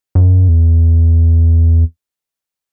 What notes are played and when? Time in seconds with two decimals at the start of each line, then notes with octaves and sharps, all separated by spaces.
0.15 F#2
0.48 E2